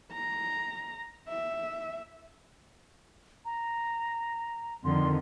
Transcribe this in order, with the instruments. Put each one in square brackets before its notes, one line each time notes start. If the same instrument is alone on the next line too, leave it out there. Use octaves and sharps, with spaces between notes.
[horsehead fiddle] A#5
E5
[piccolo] A#5
[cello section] F2 D3 D#3 [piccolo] C6